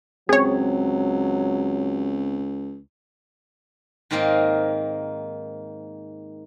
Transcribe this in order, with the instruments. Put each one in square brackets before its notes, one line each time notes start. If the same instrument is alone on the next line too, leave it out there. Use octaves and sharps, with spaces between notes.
[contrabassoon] C#2 [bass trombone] F#3 [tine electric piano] C4 [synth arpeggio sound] G#4 C#5
[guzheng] G#2 D#3 A#3 C4 D#4 A#4